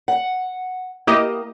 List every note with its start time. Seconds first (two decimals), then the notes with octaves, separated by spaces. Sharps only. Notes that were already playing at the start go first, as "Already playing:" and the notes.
0.08 F#5
1.07 A#3 E4 G4 D#5